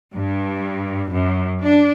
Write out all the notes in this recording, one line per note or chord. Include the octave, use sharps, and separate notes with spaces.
G2
F#2
D4